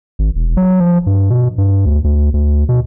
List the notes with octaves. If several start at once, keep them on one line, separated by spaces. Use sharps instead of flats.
G#1
E1
F#3
F3
G2
B2
G2
D2
D2
D2
B2